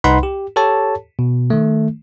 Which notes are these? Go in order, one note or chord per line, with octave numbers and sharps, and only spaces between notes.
C2 D#4 B4 F#5 B5 C6
G4
G4 A4 C#5 A5
B2
D#3 A3